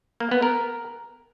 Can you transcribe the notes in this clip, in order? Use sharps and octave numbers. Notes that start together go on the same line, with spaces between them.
A#3
B3
A#4